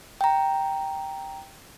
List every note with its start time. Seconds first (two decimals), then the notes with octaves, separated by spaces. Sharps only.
0.21 G5 A#5